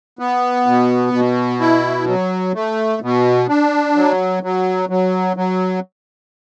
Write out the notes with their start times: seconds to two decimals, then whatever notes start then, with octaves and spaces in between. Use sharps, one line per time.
0.19 B3
0.66 B2
1.13 B2
1.60 E4
2.08 F#3
2.55 A3
3.02 B2
3.49 D4
3.96 F#3
4.43 F#3
4.89 F#3
5.37 F#3